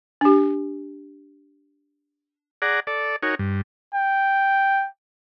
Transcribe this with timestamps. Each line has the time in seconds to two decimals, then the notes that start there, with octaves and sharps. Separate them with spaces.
0.21 D4 G4
2.62 G#4 D5 F#5 A#5
2.87 A4 D5
3.23 D#4 F#4 A#4 C#5 G#5
3.39 G2
3.95 G5